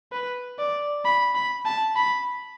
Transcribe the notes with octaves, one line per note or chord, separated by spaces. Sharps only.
B4
D5
B5
B5
A5
B5